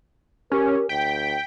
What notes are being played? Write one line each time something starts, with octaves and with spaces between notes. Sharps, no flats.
C#4 G4 A#4
D2 G5 B6